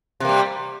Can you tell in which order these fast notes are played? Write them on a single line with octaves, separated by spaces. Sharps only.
C3 A#3 G3